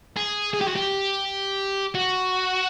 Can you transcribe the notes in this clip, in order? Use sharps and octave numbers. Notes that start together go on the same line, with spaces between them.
G#4
G#4
G4
F#4
G4
F#4